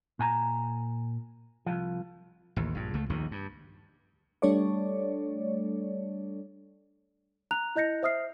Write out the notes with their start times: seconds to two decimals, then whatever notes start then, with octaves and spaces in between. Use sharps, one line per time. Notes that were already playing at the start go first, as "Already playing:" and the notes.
0.19 A#2 G#5 A#5
1.66 C2 F3
2.56 A1 D#2
2.75 A#1 G2
2.94 C#2 A3
3.10 A#1 D#2 D#3
3.31 G2
4.42 G3 A3 D4 A4 C#5 D5
7.51 A#5 F#6 F7
7.76 E4 D#5 G6 A#6 C#7
8.03 C5 E5 D#6 F6 C7